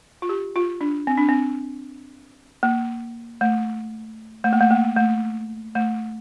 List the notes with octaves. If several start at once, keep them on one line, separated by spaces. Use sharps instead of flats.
F4
G4
F4
D4
C4
D4
C4
A#3
A3
A3
A#3
A3
A#3
A3
A3